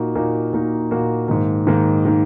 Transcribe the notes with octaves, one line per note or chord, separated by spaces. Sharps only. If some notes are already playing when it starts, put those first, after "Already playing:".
Already playing: A#2 A#3 D#4 F#4
A#2 A#3 D#4 F#4
A#2 A#3 D#4 F#4
A#2 A#3 D#4 F#4
G#2 D#3 A#3
G#2 D#3 A#3
D#3 A#3